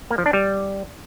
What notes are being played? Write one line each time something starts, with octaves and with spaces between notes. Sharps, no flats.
A#3
F3
D4
G3